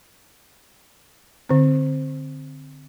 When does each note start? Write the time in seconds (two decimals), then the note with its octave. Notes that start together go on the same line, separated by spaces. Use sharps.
1.49 D3 C4